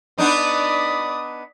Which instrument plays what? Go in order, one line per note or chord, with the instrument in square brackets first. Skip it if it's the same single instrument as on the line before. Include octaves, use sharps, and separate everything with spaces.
[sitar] B3 D4 D#4 [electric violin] D5 D#6